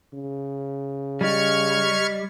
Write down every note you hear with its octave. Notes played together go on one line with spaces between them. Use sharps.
C#3
G3 D#5 C#6 F6 G#6